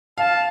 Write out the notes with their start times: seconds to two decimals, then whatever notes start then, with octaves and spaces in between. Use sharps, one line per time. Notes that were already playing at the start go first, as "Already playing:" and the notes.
0.18 F5 A5